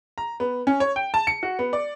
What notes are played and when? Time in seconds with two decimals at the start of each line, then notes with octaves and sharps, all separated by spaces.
0.18 A#5
0.40 B3
0.67 C#4
0.80 C#5
0.96 G5
1.14 A5
1.27 C#7
1.43 F#4
1.59 B3
1.73 D5